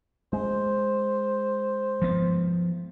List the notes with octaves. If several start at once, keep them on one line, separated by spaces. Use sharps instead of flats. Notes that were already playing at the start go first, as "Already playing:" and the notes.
G#3 C5
F3 B3